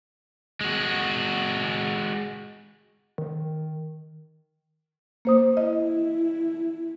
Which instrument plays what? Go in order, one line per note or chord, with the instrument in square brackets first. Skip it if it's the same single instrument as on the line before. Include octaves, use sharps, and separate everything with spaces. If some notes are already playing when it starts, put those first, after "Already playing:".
[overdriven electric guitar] G#3 F#4
[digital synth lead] D#3
[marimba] A#3 C5 D#6
[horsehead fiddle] E4 [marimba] D#5